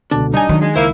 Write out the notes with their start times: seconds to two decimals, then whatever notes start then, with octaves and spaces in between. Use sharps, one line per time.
0.11 C#2 B2 D3 D4
0.34 G3 D4 D#4 G#5
0.49 D#3 F#3
0.61 G#3
0.76 C#2 A#3 E4 C5